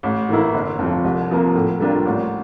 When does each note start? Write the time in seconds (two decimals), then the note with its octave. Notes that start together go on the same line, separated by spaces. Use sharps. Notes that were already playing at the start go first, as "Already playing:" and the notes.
0.03 A1
0.29 A2 E3 A#3 E4
0.54 G1
0.79 F2 C3 F3
1.04 C2
1.30 C3 F3 A#3
1.55 A2
1.80 G3 A#3 D4 F4
2.05 A1